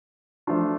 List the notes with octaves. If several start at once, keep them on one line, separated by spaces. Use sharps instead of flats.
F3 A3 D4 F4